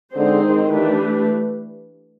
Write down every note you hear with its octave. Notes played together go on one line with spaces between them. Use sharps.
D3 G#3 C4 D#4 G#4 C5
D#3
E3 A3 D4 G4 B4